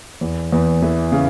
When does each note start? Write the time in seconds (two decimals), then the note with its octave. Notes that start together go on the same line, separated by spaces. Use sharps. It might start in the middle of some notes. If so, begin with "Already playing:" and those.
0.21 E2
0.52 E2
0.82 E3
1.12 C#3